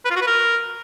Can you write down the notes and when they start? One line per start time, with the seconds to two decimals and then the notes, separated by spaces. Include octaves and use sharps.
0.05 B4
0.10 F4
0.16 F#4
0.22 B4
0.27 A#4